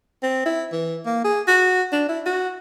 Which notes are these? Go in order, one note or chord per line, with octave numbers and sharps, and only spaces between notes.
C4
E4
E3
A#3
G#4
F#4
D4
E4
F#4